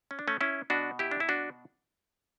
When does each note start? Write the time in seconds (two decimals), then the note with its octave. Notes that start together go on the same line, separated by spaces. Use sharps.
0.11 C#4
0.19 D4
0.28 A3 C#4
0.41 C#4 E4
0.70 B2 D4 F#4
0.99 E4 G4
1.11 D4
1.20 E4
1.29 D4 F#4